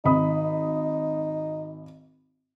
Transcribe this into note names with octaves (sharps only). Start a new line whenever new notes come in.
G#1 D#4 B5 D#6